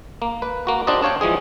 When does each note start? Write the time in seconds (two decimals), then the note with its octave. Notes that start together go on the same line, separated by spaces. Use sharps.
0.22 A#3
0.42 B4
0.67 A#3 F#4
0.87 D4 F4 G4 C5 D5 D#5
1.02 D4 C#5 F5 G5
1.21 E3 F3 G#3 G#4